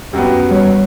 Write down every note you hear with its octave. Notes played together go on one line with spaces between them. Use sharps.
F#2 F#3 B3 G4
G3 C#5